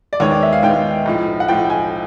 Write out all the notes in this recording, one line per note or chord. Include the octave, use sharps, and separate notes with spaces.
D5
D#2 D#3 G#3 B3 C#5
D5
E5
F5
D#2 D#3 G#3 B3 G5
B1 A2 F3
F#5
B1 A2 F3 G5
G#5